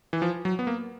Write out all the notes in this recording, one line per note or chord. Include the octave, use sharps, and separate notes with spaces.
E3
F3
F#3
B3
A#3